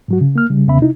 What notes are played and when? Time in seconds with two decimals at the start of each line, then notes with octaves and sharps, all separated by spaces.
0.08 G#2 F#3 F#4
0.21 C#3
0.36 A#3 F6
0.50 C#3 G3
0.68 E2 C#3 B3 E5 B5
0.80 C3 D#4 E4